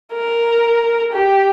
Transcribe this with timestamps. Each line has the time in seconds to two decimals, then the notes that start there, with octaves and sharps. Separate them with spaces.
0.13 A#4
1.13 G4